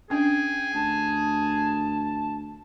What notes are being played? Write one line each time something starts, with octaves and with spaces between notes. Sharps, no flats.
C#4 D4 G#4 G5
D2 A5